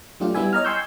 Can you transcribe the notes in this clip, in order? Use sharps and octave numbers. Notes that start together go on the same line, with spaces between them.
F#3 A3 D4 F4 G4
G3 B3 E4 E5 G#5
C#5 D#5 A#5 F6
G5 G#5 C6 C#6 E6 G6